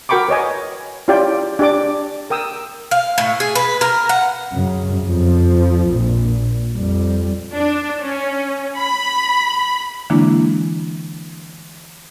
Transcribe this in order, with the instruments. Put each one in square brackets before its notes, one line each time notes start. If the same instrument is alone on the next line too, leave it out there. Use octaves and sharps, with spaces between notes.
[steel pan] F#4 A#4 G5 B5 C#6 D6
B4 C#5 D#5 G#5
C#4 E4 F4 G4 D5 G5
D4 G4 D5 D6
A#4 G5 D#6 E6
[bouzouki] F5
A2
G#4
B4
A#4
F#5
[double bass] F#2 C#3
F2 F3
A#1 A#2
F2 G3
[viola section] D4
C#4
B5
[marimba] D3 E3 G#3 A#3 D4 E4